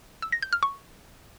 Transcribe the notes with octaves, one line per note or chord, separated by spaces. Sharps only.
E6
A#6
G6
F6
C#6